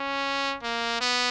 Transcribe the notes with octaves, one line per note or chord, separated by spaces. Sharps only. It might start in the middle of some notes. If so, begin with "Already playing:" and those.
Already playing: C#4
A#3
B3